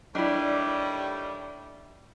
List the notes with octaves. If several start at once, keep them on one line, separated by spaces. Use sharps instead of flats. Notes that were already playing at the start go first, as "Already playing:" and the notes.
A2 D#3 G3 D4 E4